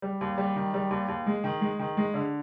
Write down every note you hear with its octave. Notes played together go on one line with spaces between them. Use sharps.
G3
D#2
G3
D#3
G3
D#2
D#2
G#3
D#3
G#3
D#3
G#3
D3